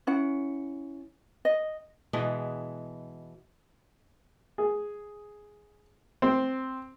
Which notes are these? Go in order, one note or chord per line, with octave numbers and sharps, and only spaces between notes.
C#4 E4 F#5
D#5
B2 E3 G#3 B3
G#4
C4